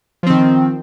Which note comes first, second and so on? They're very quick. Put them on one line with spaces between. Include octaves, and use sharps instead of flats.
F3 C4 D#3